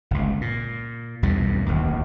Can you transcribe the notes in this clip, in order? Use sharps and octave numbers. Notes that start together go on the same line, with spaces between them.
G1 C#2
A#2
B1 E2 G2 G3
D1 D#2